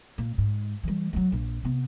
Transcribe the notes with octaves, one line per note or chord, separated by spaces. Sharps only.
A#2
G#2
E3 G3
F#3 G#3
A#1
C3 B3